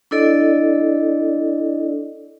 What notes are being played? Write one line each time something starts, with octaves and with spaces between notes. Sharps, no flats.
D4 E4 A4 D5 D#5